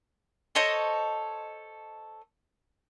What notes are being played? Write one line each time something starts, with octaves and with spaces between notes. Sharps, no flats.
A4 C5 C#5 D#5